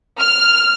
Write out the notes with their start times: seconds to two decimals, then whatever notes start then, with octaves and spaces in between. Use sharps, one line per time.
0.20 F6